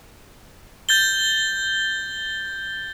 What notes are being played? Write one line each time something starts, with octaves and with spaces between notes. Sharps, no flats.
G6 A6 G7